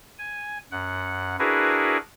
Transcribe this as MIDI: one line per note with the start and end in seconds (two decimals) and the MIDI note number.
0.19 0.58 80
0.72 1.36 42
0.72 1.36 78
1.39 1.97 62
1.39 1.97 64
1.39 1.97 66
1.39 1.97 68
1.39 1.97 70
1.39 1.97 71